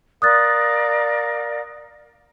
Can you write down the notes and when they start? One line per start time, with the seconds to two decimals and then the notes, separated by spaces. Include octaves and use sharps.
0.22 A#4 D5 F5 D#6 F#6 A6